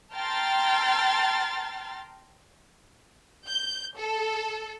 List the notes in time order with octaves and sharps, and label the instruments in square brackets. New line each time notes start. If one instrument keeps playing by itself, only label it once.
[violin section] G5 A5 A#5 C6 F6 A6
G6
A4